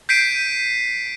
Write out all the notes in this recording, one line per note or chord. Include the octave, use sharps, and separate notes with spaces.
G6 B6 C7 D7 D#7